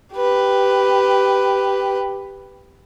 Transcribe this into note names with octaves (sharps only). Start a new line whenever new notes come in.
G4 B4